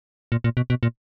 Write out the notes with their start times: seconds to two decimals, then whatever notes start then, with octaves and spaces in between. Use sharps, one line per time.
0.32 A#2
0.44 A#2
0.57 B2
0.70 B2
0.83 A#2